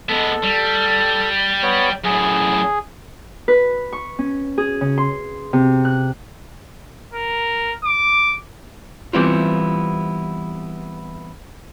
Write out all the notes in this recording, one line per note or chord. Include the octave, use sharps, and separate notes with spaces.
G#3 B3 A4
G3
B3 C#5
F#2 A2 G#4
B4
C#6
C#4
G#4
C#3
C6
C3
F#6
A#4
D6
E3 G3 B3 C4 E4 F4